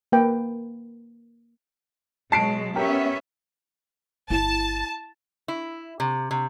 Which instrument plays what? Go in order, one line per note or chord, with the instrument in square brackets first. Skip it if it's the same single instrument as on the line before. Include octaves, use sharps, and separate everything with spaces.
[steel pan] A#3 B4 G5
[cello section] B2 F#3 G#3 [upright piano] A5 C7 D7
[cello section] B3 C#4 E5 [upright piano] G4 A#4
[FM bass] G1 [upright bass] E4 [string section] A5
[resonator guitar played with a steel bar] E4
C3
C3